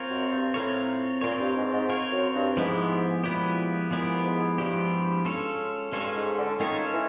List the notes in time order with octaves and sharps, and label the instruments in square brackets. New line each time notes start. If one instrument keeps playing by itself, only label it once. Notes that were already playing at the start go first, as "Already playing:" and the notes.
Already playing: [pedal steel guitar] C4 F4 A#4 C#5
[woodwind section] F#2
G2
[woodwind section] A2 [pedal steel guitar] C4 F4 A#4 C#5
[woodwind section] A#2 [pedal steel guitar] C4 F4 A#4 C#5
[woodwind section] G2
G#2
G#2
[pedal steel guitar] C4 F4 A#4 C#5
[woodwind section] F#2
G2
[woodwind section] G#2 [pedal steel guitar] F3 G#3 B3 E4 G4
[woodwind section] A#2 [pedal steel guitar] F3 G#3 B3 E4 G4
[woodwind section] A#2 [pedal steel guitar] F3 G#3 B3 E4 G4
[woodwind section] G#2
[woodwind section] G2 [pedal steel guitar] F3 G#3 B3 E4 G4
[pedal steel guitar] G#3 C#4 F4 A4 C#5
[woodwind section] G2 [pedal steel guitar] G#3 C#4 F4 A4 C#5
[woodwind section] G#2
D3
[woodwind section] D#3 [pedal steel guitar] G#3 C#4 F4 A4 C#5
[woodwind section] E3